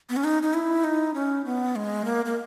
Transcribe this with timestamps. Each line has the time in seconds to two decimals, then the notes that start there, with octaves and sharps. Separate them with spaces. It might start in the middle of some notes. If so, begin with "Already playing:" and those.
0.09 B3
0.16 C#4
0.24 D#4
0.43 D#4
0.54 E4
0.84 D#4
1.14 C#4
1.45 B3
1.76 G#3
2.05 A#3
2.25 A#3